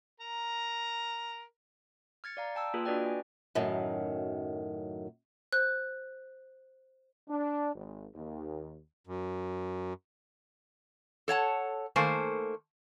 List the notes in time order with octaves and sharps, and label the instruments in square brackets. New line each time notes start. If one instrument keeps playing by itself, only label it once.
[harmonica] A#4 A#5
[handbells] F6 G#6 A6 C#7
D5 F5 A#5
G5 A5 E6
A#3 F4 G#4 B4
D4 F#4 B4 D5 D#5 G5
G#5
[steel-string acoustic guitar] F#2 A2 D#3 F#3
[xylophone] C5 F#6
[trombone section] D4
G#1
D#2
[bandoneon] F#2
[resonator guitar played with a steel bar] A4 C#5 F#5 A5
D#3 A3 A#3 A4 C5 G#5